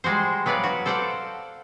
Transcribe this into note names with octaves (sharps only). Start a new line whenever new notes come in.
G3 G#3 F#4 C5
F#3 B3 B4 D5 F5
F#4
A4 C5 D5 F5 F#5